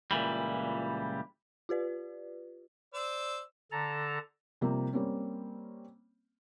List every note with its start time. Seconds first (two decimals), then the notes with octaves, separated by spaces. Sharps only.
0.11 C#2 A#2 E3 G3
1.69 F4 G4 B4 D5
2.94 C5 D5 E6
3.71 D3 A4 A5 A#5
4.61 C3 F3 G3 A#3 C4
4.93 G3 A#3 C4 C#4